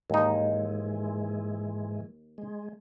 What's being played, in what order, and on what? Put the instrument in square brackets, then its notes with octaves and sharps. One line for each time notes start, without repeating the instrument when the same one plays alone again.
[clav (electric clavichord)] D#2 D#4 [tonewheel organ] G#2 E3 G#3
[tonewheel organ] G#3